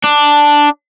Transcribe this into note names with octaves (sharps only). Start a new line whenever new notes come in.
D4